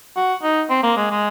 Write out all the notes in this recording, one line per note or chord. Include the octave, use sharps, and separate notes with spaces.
F#4
D#4
C4
A#3
G#3
G#3